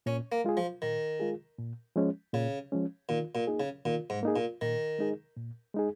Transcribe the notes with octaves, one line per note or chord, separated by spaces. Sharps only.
A#2 C#4
A#3
G#3 F4 G#4
F3
A#2 D#3
G#3 F4 G#4
A#2
F3 G#3 C#4
A#2 C#3
F3 G#3 C#4
A#2 D#3
A#2
A#3 D#4 G#4
C#3
A#2 D#3
G#2
A#3 D#4 G#4
A#2
A#2 D#3
G#3 D#4 G#4
A#2
G#3 D#4 G#4